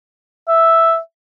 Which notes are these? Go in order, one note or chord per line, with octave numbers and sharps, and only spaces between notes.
E5